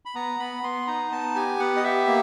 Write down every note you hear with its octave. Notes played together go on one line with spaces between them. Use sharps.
B5
B3 A#5
B3 B5
B3 C6
D#4 A#5
B3 A5
G4 G#5
B3 F#5
D#5
G4 E5
A#3